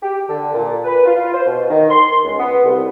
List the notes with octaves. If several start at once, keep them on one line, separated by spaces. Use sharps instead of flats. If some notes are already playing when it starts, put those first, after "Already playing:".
G4
D3
A#2
B4
F4
C5
B2
D#3
C6
C#2
B3
C2